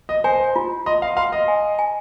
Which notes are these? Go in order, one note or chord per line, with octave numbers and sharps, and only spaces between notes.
D#5
C5 G#5
F4
D#5 C6
F5
F5 C6
D#5
G#5
G#5